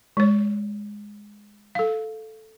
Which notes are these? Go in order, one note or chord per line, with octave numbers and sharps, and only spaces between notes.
G#3 C#5
A4 F5